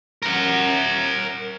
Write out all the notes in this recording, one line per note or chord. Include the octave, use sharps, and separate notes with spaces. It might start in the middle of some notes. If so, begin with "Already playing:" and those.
A#4 F#5